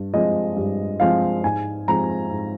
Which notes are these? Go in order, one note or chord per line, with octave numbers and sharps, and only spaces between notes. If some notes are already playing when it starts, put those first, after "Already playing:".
Already playing: G2
F3 G#3 C4 D#5
G2
F3 G#3 C4 F5
G#2 G#5
F3 G#3 C4 A#5
G#2